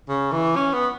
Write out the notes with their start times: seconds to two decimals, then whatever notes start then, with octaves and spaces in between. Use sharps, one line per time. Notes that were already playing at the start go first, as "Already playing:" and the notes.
0.08 C#3
0.32 E3
0.56 C#4
0.73 B3